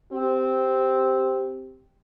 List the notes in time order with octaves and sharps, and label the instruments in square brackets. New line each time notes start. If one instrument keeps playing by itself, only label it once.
[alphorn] C4 [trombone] G4